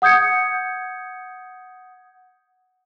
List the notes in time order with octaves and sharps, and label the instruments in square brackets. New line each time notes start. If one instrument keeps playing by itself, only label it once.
[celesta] F#5 D#6 G6 G#6 C#7